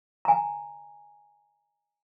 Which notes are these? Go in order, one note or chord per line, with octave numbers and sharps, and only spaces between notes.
G#5 A#5